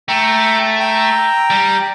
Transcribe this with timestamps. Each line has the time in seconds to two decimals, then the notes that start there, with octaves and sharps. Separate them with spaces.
0.08 A3 G5 A#5
0.80 G5 A#5
1.50 G3